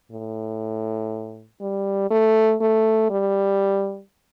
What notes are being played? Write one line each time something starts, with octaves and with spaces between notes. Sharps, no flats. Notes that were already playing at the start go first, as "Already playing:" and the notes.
A2
G3
A3
A3
G3